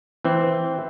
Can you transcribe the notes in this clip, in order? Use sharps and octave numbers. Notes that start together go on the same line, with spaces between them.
E3 C4